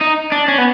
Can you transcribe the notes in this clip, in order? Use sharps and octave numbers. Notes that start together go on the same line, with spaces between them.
D#4
D4
C#4
B3